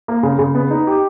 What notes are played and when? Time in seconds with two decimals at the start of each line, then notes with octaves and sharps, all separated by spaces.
0.08 A#3
0.23 C#3
0.39 C#3
0.55 B3
0.70 D#4
0.87 G4